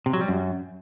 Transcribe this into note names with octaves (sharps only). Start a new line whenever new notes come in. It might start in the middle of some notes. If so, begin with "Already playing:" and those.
C3
F#3
G3
F#2